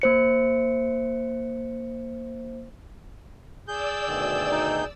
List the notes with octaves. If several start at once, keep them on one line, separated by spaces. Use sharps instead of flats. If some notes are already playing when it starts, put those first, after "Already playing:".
A#3 C5 C#7
G#4 D5 E6 G6
D2 B2 D#3
D#4